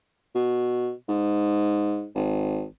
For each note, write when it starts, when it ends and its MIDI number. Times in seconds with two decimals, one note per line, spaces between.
0.35 0.92 47
1.08 2.07 44
2.15 2.64 32